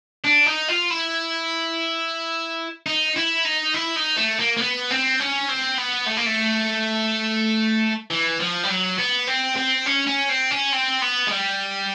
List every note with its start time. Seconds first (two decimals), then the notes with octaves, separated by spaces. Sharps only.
0.24 D4
0.46 D#4
0.68 F4
0.90 E4
2.86 D#4
3.16 E4
3.45 D#4
3.74 E4
3.96 D#4
4.17 A3
4.39 A#3
4.57 A#3
4.61 B3
4.91 C4
5.20 C#4
5.49 C4
5.78 B3
6.07 A3
6.17 A#3
6.26 A3
8.11 E3
8.40 F3
8.63 G3
8.69 F#3
8.98 B3
9.27 C4
9.56 C4
9.86 C#4
10.07 C#4
10.29 C4
10.51 C#4
10.73 C4
11.02 B3
11.27 G#3
11.31 G3